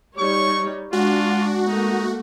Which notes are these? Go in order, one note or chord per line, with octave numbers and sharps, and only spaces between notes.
G3 D#4 C#5 C#6
G#3 D4 F4 F#4
A3 A#3 D#4